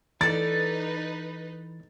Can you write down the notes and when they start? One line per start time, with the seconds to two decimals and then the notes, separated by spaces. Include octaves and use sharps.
0.21 E3 D#4 A4 B4 D5 A6